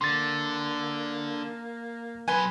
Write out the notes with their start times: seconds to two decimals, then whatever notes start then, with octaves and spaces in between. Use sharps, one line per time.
0.01 D3 A#3 C6 A6
2.28 B1 B4 G#5 C6